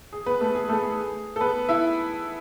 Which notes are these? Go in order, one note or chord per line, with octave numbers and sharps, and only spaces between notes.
G#4
B3 B4
A3 A4
G#4
A3 A4
G#4
A4
B3 B4
E4 E5